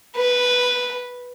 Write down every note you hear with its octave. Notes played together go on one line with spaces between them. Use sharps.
B4